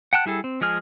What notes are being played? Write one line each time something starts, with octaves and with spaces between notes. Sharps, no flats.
F#5 G5 A5 F#6
G3 E4 G#4 A4
C4
F3 G#3 G#4 F6